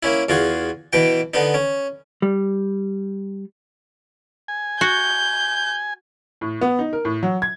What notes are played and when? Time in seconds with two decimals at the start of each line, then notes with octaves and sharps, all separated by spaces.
0.03 A#3 C#4 E4
0.29 E2 F4 F#4 G#4
0.93 B2 E3 G5
1.34 D3 B3 D#4
1.54 C#4
2.22 G3
4.48 G#5
4.81 F#4 G6
6.41 A2
6.61 B3
6.79 D#4
6.93 A#4
7.05 A2
7.23 F#3
7.42 G#6